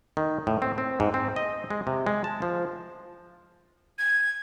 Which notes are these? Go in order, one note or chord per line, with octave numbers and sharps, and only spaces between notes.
D#3
A2
C4
C4
G#2
C4
D#5
G#3
C3
G#3
A5
F3
G#6